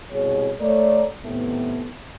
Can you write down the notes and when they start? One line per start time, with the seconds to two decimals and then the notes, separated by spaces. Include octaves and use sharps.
0.11 C2 B2 G#4 C#5
0.60 A3 A#4 C#5 D5
1.24 A2 C3 D#3 A3 B3